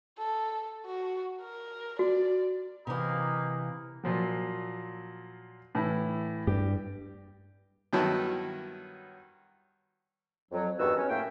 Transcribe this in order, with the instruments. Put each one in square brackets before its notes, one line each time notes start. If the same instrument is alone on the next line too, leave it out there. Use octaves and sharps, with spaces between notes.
[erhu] A4
F#4
A#4
[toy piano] F#4 [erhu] D5
[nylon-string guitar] C3 E3 [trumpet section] A#3 D#4
[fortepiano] A#2 F3 F#3
A2 E3 E4
[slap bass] G2 [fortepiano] G4
[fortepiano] G2 D#3 F#3 B3 E4 A5
[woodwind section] F2 F#3
E2 G2 D#3 F#4 B4 E6
C#4
A2 A#3 E5 G5